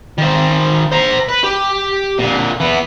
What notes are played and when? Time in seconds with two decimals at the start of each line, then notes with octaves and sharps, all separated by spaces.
0.18 D#3 C5
0.91 C5 A#5
1.28 B4
1.44 G4
2.19 A#2 D3
2.60 E3 B3